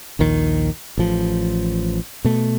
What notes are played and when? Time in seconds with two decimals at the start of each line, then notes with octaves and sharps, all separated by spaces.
0.19 A#1 D#2 D#3
0.98 A1 F3
2.25 B2 A3